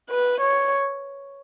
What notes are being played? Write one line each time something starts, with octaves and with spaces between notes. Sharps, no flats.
B4
C#5